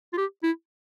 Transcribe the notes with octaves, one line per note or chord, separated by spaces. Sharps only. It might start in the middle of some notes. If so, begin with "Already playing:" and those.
F4
G4
E4